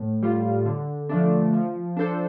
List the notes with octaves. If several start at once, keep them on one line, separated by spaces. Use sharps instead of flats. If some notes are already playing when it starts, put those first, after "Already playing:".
Already playing: A2
G3 F4
D3
F3 A3 D4
F3
D4 A4 C5